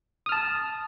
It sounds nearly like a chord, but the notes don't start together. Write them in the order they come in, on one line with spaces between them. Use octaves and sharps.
D#6 F6 A5